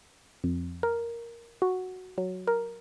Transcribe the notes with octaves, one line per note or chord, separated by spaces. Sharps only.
F2
A#4
F#4
F#3
A#4